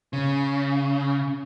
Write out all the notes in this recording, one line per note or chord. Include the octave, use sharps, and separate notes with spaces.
C#3